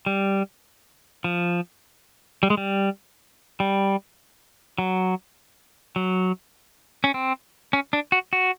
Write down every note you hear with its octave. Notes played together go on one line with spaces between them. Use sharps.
G3
F3
G3
G#3
G3
G3
F#3
F#3
C#4
C4
C#4
D4
F#4
F#4